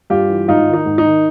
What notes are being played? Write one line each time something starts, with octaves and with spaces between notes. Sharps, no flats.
G2 F4 G4
E3
G#2 D#4 F4
D#3
D#4
G#2
D#4
D#3